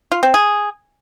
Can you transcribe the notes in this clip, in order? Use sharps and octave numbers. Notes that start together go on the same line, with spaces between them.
F4
C4
G#4